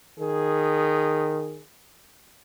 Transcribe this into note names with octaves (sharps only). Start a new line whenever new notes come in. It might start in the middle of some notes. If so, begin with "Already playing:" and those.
D#3 G#4